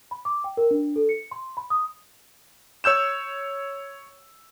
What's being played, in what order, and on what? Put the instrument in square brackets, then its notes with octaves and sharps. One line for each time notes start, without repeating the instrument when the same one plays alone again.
[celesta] B5
D6
G5
A#4
D4
A4
C#7
C6
B5
D#6
[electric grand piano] C#5 E6 G6 E7